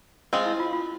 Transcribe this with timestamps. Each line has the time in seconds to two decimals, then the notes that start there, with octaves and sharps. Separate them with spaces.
0.33 G#3 C4 C#4 F4
0.46 E4
0.60 F4
0.73 F4